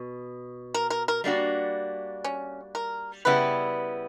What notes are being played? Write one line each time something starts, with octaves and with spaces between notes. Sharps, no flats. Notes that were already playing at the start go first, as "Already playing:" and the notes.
Already playing: B2
A#4
A#4
A#4
G3 A#3 D4 F#4
C#4
A#4
C#3 G3 B3 E4 B4